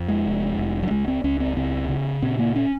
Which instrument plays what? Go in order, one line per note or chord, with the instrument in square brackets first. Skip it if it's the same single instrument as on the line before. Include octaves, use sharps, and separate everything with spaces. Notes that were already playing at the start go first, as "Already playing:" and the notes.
Already playing: [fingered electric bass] F2
G#3
F1
F1
F#3
C#2 G#3
C4
C#2 C#4
C4
C#3 C4
C#3
A#2 C4
A#3
C#4